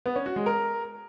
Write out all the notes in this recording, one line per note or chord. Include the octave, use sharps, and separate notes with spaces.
B3
C#4
F#4
G#3
A#4